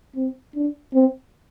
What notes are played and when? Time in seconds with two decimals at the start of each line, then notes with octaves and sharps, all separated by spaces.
0.16 C4
0.55 D4
0.93 C4